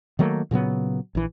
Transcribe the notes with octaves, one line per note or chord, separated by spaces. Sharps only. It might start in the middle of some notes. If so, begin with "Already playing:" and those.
D#3 F#3 A3 A#3
A#2 C#3 F#3 B3
A#1 E3